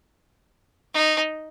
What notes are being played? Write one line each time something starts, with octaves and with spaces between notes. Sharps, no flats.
D#4